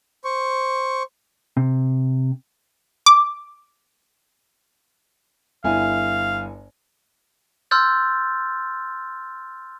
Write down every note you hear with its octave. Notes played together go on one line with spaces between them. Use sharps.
C5 C#6
C3
D6
G1 E4 F5 G#5
C6 E6 F6 G6 A6